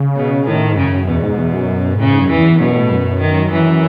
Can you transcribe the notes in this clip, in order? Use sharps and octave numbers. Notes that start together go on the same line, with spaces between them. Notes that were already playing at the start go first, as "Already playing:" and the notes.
Already playing: C#3
B2
A2 D#3
G#2
F#2 C#3
E2 B2
G#2
E2
F#2
G#2
A2 C#3
G#2
F#2
E2 E3
F#2 B2
A2
F#2
D#3
F#2 E3